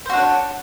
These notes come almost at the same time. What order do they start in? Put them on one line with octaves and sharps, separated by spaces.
C5 F#4 D4 C#5